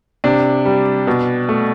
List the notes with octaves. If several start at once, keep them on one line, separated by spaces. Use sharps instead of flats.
C3 D4
G3
B2
A3